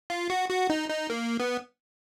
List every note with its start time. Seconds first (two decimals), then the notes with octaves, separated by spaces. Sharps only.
0.10 F4
0.30 F#4
0.49 F#4
0.70 D#4
0.90 D#4
1.10 A#3
1.40 B3